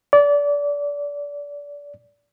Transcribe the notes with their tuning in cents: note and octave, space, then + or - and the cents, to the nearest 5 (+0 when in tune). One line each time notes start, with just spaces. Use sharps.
D5 -25